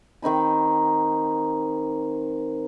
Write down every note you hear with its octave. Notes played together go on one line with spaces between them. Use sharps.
D#3 C4 D#4 B5